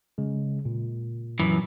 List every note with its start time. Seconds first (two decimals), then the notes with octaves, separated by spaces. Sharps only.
0.18 C#3 G#3
0.65 A#2
1.39 F#2 E3